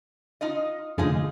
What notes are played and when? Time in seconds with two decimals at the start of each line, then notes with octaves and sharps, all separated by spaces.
0.41 D#4 F4 D#5
0.98 F1 D3 D#4 F4 G#4